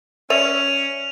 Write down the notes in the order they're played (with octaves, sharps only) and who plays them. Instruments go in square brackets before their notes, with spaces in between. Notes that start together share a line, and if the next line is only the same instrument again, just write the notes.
[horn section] C#4 [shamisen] D5 E5 [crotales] D#7 F7